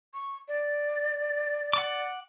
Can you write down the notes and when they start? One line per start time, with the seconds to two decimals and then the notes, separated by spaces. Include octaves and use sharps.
0.14 C#6
0.48 D5
1.73 F#5 D6